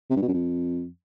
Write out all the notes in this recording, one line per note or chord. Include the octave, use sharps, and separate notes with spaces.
C3
G2
B2
F#2
F2